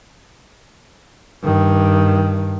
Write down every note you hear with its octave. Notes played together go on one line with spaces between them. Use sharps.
G2 D#3